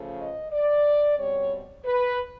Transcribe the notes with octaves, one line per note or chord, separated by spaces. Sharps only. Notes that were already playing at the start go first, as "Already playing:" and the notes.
Already playing: C#3 F3 A3
D#5
D5
B2 G3 C4 C#5
B4